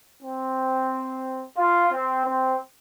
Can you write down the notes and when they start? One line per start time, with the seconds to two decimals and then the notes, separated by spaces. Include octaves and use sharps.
0.22 C4
1.58 F4
1.92 C4
2.27 C4